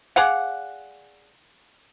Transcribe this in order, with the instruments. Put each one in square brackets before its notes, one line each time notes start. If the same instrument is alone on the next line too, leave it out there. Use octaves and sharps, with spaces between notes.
[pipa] G#4 D5 F5 F#5